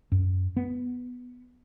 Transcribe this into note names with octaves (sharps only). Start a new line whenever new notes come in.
F#2
B3